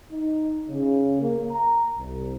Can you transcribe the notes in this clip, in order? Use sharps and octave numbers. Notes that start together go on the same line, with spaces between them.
D#4
C#3
A#3
A#5
C2